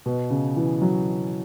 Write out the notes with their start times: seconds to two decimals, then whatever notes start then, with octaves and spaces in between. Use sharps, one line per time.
0.06 B2
0.30 C#3
0.56 E3
0.82 F#3